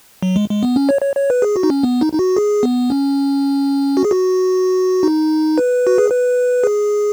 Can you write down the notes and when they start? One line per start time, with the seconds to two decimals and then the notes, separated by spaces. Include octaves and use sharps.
0.23 F#3
0.36 G#3
0.50 G#3
0.63 B3
0.76 C#4
0.89 C#5
1.02 C#5
1.16 C#5
1.30 B4
1.42 G#4
1.56 F#4
1.63 D#4
1.70 C#4
1.83 B3
2.01 D#4
2.13 D#4
2.19 F#4
2.37 G#4
2.63 B3
2.90 C#4
3.97 F#4
4.04 G#4
4.11 F#4
5.03 D#4
5.58 B4
5.87 F#4
5.98 G#4
6.10 B4
6.64 G#4